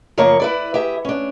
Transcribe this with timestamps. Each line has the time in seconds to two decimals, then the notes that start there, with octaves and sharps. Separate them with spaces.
0.17 F#2 C#3 F3 A#3 C#5
0.40 E4 B4 D5
0.74 G4 G#4 E5
1.05 C#4 D4